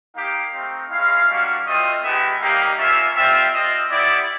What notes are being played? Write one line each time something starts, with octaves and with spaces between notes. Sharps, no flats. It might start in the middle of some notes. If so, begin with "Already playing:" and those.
A#3 D#4 G4 F5
A3 C4 D#4
G#3 C#4 E4 F5
G3 A#3 D4 F#4
A3 C4 F4 D#5
G#3 B3 D#4 G4 E5
G3 A#3 D#4 G4 F5
A#3 C#4 F4 E5
G3 C4 F4 E5
C4 F4 D#5
B3 E4 G4 D5